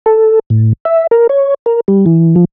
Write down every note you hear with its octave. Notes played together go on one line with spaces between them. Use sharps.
A4
A2
E5
A#4
C#5
A#4
G3
E3
F3